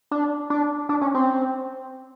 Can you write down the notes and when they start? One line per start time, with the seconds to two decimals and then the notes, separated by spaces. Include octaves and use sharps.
0.11 D4
0.50 D4
0.89 D4
1.01 C#4
1.15 C4